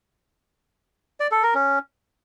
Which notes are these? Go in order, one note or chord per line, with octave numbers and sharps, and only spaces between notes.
D5
A4
A#4
C#4